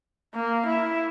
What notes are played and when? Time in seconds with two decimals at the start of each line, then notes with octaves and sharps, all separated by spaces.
0.34 A#3
0.67 E4